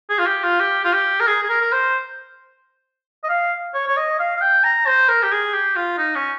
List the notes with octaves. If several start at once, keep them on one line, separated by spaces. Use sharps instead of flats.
G#4
F4
G4
F4
G4
F4
G4
A#4
G#4
G#4
A#4
A#4
C5
D#5
F5
C#5
C#5
D#5
F5
F5
G5
A#5
C5
A#4
G4
G#4
G4
F4
D#4
C#4